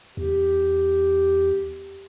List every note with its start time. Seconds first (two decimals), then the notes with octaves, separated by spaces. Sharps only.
0.17 E2 G4